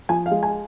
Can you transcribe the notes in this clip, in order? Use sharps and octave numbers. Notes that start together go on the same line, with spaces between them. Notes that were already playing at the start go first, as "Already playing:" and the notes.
F3 G#5
F5
G#3
G#5